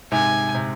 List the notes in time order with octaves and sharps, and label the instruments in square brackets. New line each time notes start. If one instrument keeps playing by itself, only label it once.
[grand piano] G#2 C3 [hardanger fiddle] G#5
[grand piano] C3